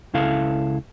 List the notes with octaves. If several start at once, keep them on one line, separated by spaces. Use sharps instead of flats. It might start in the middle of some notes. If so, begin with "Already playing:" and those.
C#2 C#3 E4 A4 F5